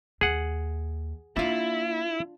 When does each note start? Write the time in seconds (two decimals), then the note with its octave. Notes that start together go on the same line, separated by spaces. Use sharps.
0.21 D#2 G#4 F#5
1.37 A#3 D4 E4 F4